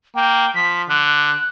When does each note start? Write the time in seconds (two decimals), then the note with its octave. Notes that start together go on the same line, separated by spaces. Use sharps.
0.15 A#3 G5
0.55 F3 B6
0.89 D3 F#6